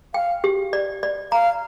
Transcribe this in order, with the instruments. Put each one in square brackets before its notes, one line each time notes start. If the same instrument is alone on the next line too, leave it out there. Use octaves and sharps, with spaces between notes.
[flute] F5 [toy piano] G5
[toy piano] G4
D5
D5
[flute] F5 [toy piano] A#5